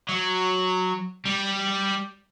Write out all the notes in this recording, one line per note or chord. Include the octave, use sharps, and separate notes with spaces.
F#3
G3